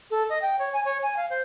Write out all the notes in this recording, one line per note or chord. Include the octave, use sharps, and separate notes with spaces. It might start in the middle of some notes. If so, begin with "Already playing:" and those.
A4
D#5
G5
C#5
G#5
C#5
G#5
F5
C5